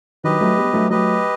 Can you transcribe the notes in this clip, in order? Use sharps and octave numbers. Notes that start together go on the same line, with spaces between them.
D#3 F#3 G4 B4 D#5
F#3 A3
G3 B3
F#3 A3
F#3 A3 G4 B4 D#5